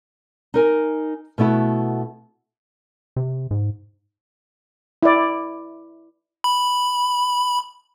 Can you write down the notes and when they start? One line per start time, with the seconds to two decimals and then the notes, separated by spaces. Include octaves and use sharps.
0.54 D#4 A#4 G#5
1.38 B2 A3 B3 E4 F#4
3.16 C3
3.51 G#2
5.03 E4 D5
6.44 B5